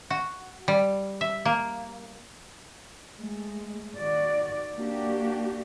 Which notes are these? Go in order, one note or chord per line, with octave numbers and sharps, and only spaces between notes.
F#4
G3
E5
A#3
G#3 A3
D#3 F#4 D5
A#3 D4 F#4 G4